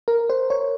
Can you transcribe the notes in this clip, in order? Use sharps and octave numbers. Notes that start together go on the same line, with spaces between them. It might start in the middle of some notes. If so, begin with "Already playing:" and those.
A#4
C5
C#5